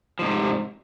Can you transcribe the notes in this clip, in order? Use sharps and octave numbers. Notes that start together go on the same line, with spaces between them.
G#2 C3 F3